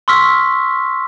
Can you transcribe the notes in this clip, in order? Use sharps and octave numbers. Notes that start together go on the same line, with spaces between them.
C6 C#6 E6 F6 B6